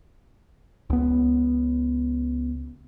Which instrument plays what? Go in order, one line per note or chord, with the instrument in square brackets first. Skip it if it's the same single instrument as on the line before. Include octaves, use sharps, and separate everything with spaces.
[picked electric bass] C#2 B3